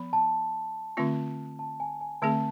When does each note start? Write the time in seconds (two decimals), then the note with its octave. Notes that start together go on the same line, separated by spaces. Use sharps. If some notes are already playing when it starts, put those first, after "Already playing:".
Already playing: F3 B3 B5
0.13 A5
0.97 D3 A3 C4 F4
1.59 A5
1.80 G#5
2.01 G#5
2.22 D3 A3 C4 G#4 A5